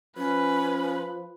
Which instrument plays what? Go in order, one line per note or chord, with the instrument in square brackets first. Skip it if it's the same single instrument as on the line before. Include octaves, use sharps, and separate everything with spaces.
[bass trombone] F3 [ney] C#4 [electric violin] B4